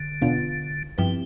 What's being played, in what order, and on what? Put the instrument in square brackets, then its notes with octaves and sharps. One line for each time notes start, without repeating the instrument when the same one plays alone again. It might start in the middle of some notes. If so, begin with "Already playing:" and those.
Already playing: [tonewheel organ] D3
[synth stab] E2 B2 B3 D4 F4
[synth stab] G2 F3 B3 E4 G4 [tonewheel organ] C4